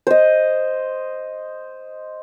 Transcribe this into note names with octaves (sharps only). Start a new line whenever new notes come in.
C5 D#5